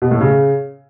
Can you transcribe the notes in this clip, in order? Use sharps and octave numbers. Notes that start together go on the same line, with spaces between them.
B2
A2
C#3